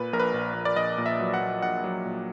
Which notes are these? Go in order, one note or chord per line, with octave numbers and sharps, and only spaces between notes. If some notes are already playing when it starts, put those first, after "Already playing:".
Already playing: A#2 B4
A#1 A#4
B4
A#1
A#1
D5
A#1 D#5
A#2
E5
F#3
F#5
A#1
A#1 F#5
F#3
A#2